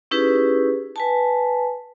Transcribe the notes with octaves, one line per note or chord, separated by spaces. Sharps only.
C#4 D#4 E4 G4 G#4 B4
B4 G#5 A5